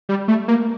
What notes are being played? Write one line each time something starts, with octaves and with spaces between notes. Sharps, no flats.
G3
A3
A#3